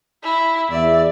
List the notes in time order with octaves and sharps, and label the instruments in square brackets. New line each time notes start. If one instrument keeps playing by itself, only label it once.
[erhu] E4
[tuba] E2 [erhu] D5 [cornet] E5